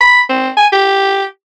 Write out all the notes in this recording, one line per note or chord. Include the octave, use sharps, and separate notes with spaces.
B5
C4
G#5
G4